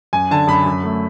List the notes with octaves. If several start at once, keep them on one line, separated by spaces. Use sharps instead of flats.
F#2 G#5
D3 A5
F#2 B5
F#2
A3